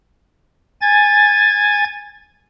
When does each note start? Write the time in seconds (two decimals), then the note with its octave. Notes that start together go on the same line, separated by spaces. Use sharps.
0.81 G#5 G#6 A6